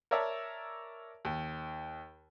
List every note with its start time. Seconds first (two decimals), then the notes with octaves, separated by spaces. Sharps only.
0.11 A#4 C#5 D5 E5 A5
1.25 D#2